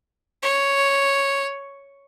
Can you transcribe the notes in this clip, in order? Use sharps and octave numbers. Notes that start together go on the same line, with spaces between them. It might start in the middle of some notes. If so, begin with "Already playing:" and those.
C#5